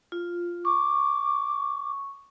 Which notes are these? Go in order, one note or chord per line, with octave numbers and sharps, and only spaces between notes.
F4
C#6 D6